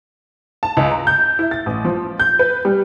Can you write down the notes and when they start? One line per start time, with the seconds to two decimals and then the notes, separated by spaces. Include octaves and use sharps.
0.63 A5
0.77 C#2
0.91 A#5
1.07 G6
1.39 E4
1.51 A6
1.66 A1
1.85 F3
2.20 G6
2.39 B4
2.65 G3